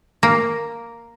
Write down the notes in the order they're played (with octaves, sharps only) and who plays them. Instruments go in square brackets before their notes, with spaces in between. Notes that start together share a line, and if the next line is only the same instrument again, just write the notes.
[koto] A#3